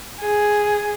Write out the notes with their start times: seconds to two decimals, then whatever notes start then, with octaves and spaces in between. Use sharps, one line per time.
0.20 G#4